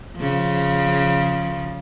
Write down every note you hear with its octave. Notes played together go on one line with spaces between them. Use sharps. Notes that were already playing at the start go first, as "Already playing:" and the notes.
C#3 F3